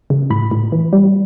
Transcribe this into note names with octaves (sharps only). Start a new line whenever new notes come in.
C#3
A2 B5
A2
E3
G3